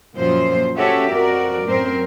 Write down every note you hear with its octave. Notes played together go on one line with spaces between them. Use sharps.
F#2 A#2 F3 F#3 C5
C#4 F#4 G4 A4 C#5 E5
F2 F#4 A#4 D5
F#2 A2 F#3 C4 A#4 C5